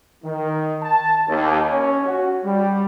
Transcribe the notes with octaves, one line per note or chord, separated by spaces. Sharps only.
D#3
A5
D#2
C#4
F#4
G3